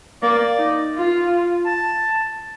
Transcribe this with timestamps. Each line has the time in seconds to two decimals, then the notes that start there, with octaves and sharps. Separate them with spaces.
0.22 A#3 D5
0.58 D#4
0.94 F4
1.66 A5